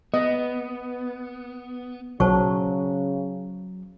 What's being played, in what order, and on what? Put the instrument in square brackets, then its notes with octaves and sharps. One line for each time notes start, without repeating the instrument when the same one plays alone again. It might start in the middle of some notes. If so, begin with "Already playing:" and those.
[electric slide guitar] B3 [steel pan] D#5
[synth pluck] B1 [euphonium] C#3 [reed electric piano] F#3 [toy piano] C5 A5 C#6